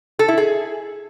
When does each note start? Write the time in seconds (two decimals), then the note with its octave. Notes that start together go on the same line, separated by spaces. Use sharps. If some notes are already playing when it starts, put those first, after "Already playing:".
0.19 A4
0.28 E4
0.38 G#4